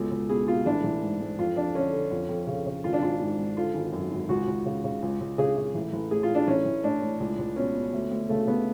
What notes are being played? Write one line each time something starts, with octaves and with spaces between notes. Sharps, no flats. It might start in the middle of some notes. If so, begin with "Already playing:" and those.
Already playing: C#2 B2 A4
C#2
B2 G#4
B2 F4
A1 D4
A1
G#2
G#2
F2 F4
F2 D4
D3 C#4
D3
F2
F2
C#3
C#3
G#1 F4
D4
G#1 F4
G#2
G#2
D3 F4
G#1
F#2
G#1
C#2 F#4
C#2
C#3
C#3
C#2
C#2
C#3 G#4
C#3
A1
A1
A2 G#4
F4
A2
D4
A1 C#4
A1
A2 D4
A2
C#2
C#2
B2 C#4
B2
D2
D2
C#3 A3
C#3 B3